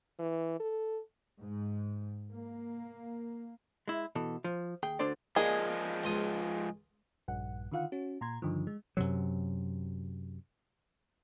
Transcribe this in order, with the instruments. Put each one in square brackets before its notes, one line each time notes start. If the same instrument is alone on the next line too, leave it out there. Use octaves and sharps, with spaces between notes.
[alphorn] E3
A4
[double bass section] G#2
A#3
[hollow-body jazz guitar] G#3 E4
B2 E3 A4
F3
D#2 G#4 G5
D2 D3 D4 C5 D5
[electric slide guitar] F3 G#3 [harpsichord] A#3 D4 D#4 [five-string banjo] G#4
[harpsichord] C#2 F4 D#6
[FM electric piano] A#1 G2 F#5
D3 D#3 F4 F5 F#5
C#4 F#4
A#2 A#5 C6 G#6
G2 D3 D#3 F3
G#3
[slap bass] F#2 C3 F#3